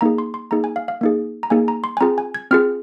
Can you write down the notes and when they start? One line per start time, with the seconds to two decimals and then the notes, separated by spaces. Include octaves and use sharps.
0.01 A#3 D#4 G#4 A#5
0.18 C6
0.34 C6
0.51 A#3 D#4 G#4 A#5
0.64 G#5
0.76 F5
0.88 F5
1.01 A#3 D#4 G#4
1.43 A#5
1.50 A#3 D#4 G#4 G#5
1.68 A#5
1.84 C6
1.97 G#5
2.01 C4 F4 G#4 A#5
2.18 G#5
2.35 G#6
2.51 C4 F4 G#4 F6